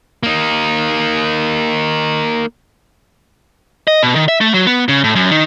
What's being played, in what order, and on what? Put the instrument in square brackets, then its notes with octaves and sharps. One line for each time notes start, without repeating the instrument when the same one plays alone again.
[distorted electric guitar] A#3 D#4
[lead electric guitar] D#5
B2
D#3
E5
A3
F#3
B3
C#3
A2
F#2
D#3